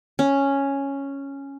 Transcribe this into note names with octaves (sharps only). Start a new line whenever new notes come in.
C#4